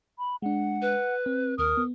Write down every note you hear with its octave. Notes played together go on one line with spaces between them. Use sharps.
B5
G#3 D4 F#5
B4
C4
D#2 A#4 D#6
B3